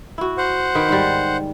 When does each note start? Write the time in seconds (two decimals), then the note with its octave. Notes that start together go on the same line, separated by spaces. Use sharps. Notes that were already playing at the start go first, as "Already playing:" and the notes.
0.18 E4 F#4
0.38 C5 F#5
0.75 D#3 B4
0.89 G#2 G3